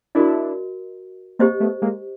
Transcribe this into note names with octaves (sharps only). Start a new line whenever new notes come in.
D4 E4 F#4 A#4 D#5
A#3 C4 G4 C5 D#5
A3 B3
G#3 A#3